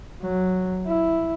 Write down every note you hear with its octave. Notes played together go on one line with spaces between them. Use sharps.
F#3
E4